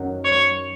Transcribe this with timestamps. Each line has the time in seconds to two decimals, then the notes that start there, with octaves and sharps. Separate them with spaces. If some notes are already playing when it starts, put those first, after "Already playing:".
Already playing: F#2 D#3 F#3
0.25 C#5